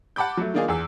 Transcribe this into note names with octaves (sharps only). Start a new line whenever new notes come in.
F#5 A5 B5 D6 G6
F#3 A3
D#3 A#3 D4 D#4 F4 G#4
E2 G#4 E6